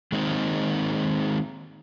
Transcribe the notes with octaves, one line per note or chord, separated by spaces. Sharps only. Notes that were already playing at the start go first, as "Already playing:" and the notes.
D#3 G#3 A#3 C4 D#4